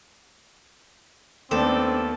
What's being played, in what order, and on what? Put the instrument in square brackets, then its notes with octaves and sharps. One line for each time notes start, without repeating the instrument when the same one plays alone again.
[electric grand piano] D#2 A3 B3 [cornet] C4 [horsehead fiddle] D4 D5 [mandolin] A4